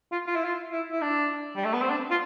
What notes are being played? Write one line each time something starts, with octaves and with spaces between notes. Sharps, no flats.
F4
F4
E4
F4
E4
E4
D4
G3
A3
B3
C4
D4
F4